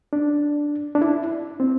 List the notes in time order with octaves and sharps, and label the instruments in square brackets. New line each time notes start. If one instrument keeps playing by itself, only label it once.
[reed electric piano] D4
D4
E4
C4